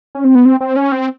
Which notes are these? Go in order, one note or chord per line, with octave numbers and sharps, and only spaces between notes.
C#4
C4
B3
C4
C4
C#4
C4